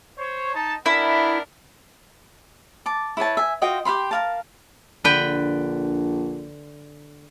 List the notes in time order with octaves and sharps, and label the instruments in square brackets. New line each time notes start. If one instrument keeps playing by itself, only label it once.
[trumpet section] C5 C#5
D#4 A5
[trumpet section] B3 D4 A#4 [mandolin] E4
[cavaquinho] A5 D6
E4 B4 C#5 A5
E5 G#5
F4 F#4 D#5 G5
G4 F5 B5 C6
A#4 F5 A5
[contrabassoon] A#1 [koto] D3 B4 G5